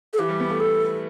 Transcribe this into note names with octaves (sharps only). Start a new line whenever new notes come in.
A4
E3 G4
G3
B3
A3
A4